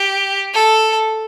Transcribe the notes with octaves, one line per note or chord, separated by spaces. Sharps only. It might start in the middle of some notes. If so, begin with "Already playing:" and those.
Already playing: G4
A4